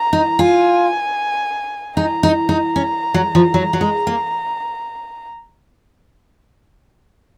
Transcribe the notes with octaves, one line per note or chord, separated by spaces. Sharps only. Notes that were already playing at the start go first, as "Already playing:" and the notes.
Already playing: A#5
D#4
F4 G#5
D#4 A#5
D#4
D#4
C#4
F#3
F3
F#3
F#3
G#3
A#3